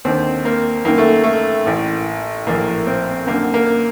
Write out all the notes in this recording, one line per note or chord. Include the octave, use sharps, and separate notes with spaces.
D#2 D3 C4
A#3
F#2 D#3 A#3
A3
A3
A1 A2
A#1 A2 A#3
C4
F#2 D3 A#3
A#3